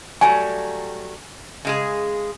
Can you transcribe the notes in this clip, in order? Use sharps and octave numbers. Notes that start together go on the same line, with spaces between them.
F#3 G3 A3 G#5
C#3 G#3 G#4